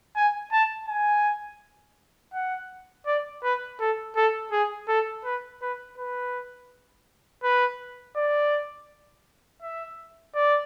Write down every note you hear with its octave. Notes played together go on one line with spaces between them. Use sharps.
G#5
A5
G#5
F#5
D5
B4
A4
A4
G#4
A4
B4
B4
B4
B4
D5
E5
D5